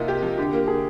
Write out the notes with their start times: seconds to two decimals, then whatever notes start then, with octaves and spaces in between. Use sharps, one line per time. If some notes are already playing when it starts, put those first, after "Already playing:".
Already playing: C3 A#3 D#4 F4
0.08 G4
0.23 F3
0.38 D3 G4
0.53 A#3
0.67 D3 G#4